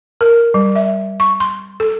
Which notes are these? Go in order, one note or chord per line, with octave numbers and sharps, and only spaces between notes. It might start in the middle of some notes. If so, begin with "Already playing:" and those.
A#4
G3
E5
C#6
C6
A4